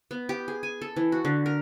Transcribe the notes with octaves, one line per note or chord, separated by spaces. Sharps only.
B3
G4
G#4
G#5
A4
E3
F#4
D3
A#4